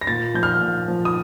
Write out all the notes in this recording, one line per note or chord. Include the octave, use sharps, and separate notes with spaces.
A#6
A#2 A6
F3 G6
F6
A#2
F3
D#6